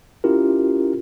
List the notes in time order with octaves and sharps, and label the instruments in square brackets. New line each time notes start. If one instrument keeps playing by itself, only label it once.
[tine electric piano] C#4 E4 F4 G4 A#4